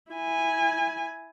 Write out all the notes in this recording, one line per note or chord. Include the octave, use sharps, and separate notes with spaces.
E4 G#5